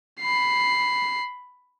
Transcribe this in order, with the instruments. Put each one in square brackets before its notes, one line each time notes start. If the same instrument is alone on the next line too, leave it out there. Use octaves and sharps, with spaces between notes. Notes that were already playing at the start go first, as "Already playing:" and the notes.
[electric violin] B5 C7